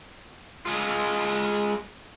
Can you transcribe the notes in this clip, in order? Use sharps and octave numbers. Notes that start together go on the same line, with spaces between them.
G#3 F4